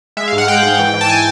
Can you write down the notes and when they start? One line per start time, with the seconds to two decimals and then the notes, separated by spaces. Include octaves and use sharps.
0.17 G#3 E5
0.28 F5
0.32 G#2
0.38 F#5
0.48 G#3 G5
0.63 G#2
0.79 E3
0.94 E3
1.01 A5
1.09 G#5